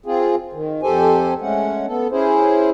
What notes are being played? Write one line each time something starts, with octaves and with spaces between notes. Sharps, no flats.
C4 F4 G#4
D#3
F2 G4 A4 C5 G#5
G#3 A3 C#4 F#5
B3 A4
C#4 E4 G#4 C5